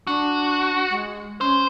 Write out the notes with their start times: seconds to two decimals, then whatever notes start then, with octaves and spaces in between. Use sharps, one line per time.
0.07 D4 F#4
0.90 G#3
1.41 C#4 C5